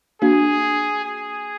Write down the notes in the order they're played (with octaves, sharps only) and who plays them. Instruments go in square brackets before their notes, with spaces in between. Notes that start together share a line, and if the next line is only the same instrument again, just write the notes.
[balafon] A#3 D4 F#4 [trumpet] G#4
[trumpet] G#4